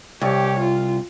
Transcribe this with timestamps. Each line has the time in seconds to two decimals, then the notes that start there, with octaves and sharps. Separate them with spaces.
0.21 C2 G4 C#5
0.59 F4